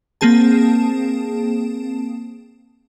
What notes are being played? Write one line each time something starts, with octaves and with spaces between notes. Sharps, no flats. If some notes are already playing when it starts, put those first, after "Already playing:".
A#3 C4 G#4 A5